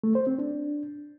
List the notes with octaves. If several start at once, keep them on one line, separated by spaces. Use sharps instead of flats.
A3
C5
C4
D4